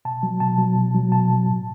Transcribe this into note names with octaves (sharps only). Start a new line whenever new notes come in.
B2 A5
F#3
B2 A5
F#3
B2
F#3
B2 A5
F#3
A2